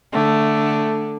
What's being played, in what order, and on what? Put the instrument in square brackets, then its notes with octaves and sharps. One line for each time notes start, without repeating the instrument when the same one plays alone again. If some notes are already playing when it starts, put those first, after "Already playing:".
[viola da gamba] D3 [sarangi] A3